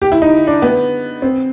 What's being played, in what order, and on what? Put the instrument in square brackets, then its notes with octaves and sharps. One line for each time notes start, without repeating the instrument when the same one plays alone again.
[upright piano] G4
E4
D#4
D4
B3
C4